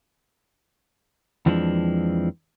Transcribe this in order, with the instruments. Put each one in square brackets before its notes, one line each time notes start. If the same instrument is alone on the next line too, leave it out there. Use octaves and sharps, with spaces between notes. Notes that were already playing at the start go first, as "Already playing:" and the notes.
[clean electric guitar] F2 E3 F3 G#3 B3 D4